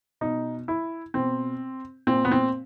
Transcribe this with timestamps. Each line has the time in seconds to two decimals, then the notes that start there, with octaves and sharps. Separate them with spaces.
0.21 B2 D#4
0.68 E4
1.14 B2 C4
2.07 A#2 C4
2.25 B3
2.31 C4